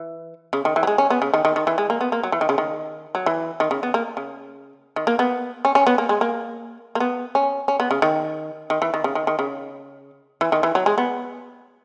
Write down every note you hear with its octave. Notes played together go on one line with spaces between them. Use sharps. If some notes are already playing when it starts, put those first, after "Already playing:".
Already playing: E3
C#3
D#3
E3
F#3
G#3
C#4
B3
C#3
D#3
D#3
D#3
E3
G#3
A#3
B3
A#3
F#3
E3
D#3
C#3
D#3
F#3
E3
D#3
C#3
B3
A#3
C#3
D#3
A#3
B3
C#4
C#4
B3
A#3
G#3
A#3
A#3
B3
C#4
C#4
B3
C#3
D#3
D#3
E3
D#3
C#3
D#3
D#3
C#3
E3
D#3
E3
F#3
G#3
B3